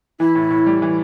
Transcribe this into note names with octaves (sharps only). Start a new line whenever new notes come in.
E3 E4
A2
A2
G3
E3